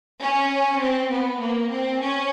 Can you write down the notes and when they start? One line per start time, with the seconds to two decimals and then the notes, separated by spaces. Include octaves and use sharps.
0.20 C#4
0.80 C4
1.10 B3
1.40 A#3
1.71 C4
2.01 C#4